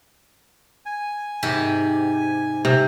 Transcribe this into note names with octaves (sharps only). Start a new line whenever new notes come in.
G#5
G#2 C3 G4
C3